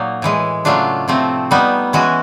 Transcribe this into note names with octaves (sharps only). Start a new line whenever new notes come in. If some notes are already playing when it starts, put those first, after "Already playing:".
Already playing: A#2 F#3 A#3 D#4
A2 E3 G#3
C#3 F#3 A3 D4 F4
C3 F3 A3 C4
G3 B3 D#4
E3 G#3 C#4 F#4